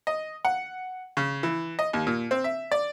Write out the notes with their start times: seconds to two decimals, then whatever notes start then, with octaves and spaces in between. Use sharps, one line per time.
0.07 D#5
0.45 F#5
1.17 C#3
1.43 E3
1.79 D#5
1.93 D#2
2.07 A#2
2.31 C4
2.44 E5
2.72 D5